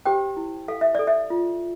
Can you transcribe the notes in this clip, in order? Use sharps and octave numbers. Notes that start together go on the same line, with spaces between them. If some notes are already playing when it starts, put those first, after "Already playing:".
G4 C5 G5
E4
A4 F5
E5
A4 D5
E5
F4